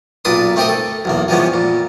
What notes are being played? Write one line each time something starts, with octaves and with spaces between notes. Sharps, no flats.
B1 A#2 B4 D5 C6 D#6
A3 C4 D#4 G4 A#4 D#5
A4
B1 E2 A#3
E3 F3 G3 G#3 B3 C#4
A#2